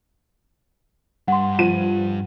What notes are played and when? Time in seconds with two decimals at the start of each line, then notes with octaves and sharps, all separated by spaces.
1.28 G2 F#5 C6
1.59 F3 D#7